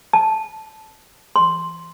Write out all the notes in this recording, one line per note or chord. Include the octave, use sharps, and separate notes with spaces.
A5
C6